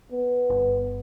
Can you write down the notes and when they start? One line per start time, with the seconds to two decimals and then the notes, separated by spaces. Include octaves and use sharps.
0.12 B3
0.50 G1